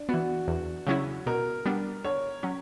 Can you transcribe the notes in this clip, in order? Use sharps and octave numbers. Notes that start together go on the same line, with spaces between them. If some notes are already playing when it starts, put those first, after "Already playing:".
Already playing: D4
E3 B3 F#4
E2
C#3 F#3 C#4 E4
B2 A#4
G3 B3 D4
D3 C#5
F#3 C#4